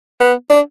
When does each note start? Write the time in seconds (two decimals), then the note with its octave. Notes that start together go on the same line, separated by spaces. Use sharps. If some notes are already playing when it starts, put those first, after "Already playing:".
0.20 B3
0.50 D4